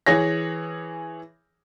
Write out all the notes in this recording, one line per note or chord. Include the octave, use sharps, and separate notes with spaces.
E3 G#4 C#5 A#6